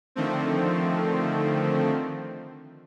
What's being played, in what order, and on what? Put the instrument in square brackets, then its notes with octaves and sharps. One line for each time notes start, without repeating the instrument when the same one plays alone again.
[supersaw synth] D3 D#3 F3 A3 C4